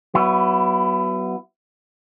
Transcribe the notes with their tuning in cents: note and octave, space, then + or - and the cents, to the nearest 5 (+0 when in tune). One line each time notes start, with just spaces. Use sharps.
F#3 +25 B3 +0 E4 +25